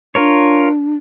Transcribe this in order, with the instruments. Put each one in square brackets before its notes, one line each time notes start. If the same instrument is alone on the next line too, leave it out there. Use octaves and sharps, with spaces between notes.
[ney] D4 [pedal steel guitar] F4 A#4 C#5